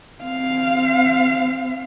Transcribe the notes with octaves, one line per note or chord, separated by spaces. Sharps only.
C4 F5